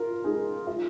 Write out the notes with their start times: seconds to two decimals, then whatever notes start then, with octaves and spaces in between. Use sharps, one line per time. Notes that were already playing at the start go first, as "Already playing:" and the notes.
Already playing: F4 A#4
0.24 D#4 G#4
0.67 F4